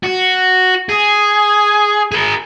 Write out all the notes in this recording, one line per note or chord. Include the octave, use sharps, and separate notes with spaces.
F#4
G#4
G#4 A#4